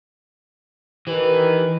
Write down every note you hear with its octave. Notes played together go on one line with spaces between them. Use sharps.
D#3 E3 G4 B4